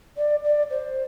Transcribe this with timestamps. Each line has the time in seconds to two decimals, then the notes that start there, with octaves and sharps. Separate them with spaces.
0.17 D5
0.44 D5
0.70 C5